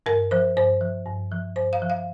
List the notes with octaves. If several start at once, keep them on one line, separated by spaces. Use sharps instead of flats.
G2 A#4
F3 C5
G2 C5
F3
G2
F3
G2 C5
F5
F3
F5